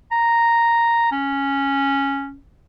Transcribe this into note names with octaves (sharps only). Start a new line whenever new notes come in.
A#5
C#4